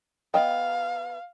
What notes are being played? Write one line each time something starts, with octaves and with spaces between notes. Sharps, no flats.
B3 D#5 F5 G5